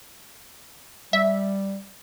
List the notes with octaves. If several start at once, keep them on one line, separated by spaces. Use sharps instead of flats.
G3 E5